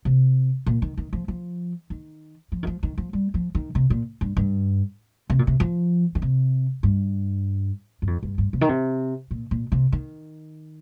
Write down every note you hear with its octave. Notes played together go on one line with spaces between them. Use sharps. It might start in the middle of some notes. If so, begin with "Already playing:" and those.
C3
A#2
D#3
D#3
F3
F3
D#3
F3
D#3
F3
D#3
F3
G3
F3
D#3
C3
A#2
G2
G2
C3
A#2
C3
F3
D#3
C3
G2
G2
F2
G2
G2
C3
D#3
C3
A#2
A#2
C3
D#3